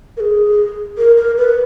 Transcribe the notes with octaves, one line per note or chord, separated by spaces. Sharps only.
A#4
G#4
A#4
A#4
B4